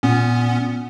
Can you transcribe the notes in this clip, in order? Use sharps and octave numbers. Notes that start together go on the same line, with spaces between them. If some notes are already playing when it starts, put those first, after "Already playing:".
A#2 B3 C#4